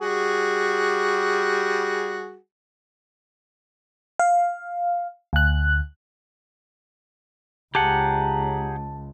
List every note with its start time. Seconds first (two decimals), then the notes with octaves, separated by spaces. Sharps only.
0.01 G3 F#4 G#4
4.19 F5
5.33 D2 F#6
7.75 C#2 G4 G#4 F#5 A5 A#5